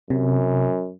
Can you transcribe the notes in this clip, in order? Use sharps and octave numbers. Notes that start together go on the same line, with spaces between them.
F#2 C3